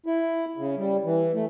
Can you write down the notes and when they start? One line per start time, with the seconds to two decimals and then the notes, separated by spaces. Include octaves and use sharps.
0.06 E4
0.57 C#3
0.77 G3
1.05 E3
1.34 A3